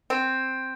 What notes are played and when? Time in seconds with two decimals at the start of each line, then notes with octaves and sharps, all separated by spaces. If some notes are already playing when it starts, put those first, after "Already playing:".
0.10 C4